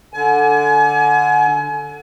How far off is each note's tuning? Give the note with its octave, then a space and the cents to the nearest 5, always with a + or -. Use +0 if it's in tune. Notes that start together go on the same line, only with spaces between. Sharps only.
D3 +0 G#5 +35